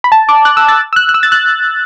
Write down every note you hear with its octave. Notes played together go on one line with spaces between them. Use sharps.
B5
A5
D6
F#6
E6
A6
E6
F#6
F#6
E6
A6
F#6